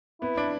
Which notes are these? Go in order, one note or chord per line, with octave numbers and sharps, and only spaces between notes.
B3 E4
D4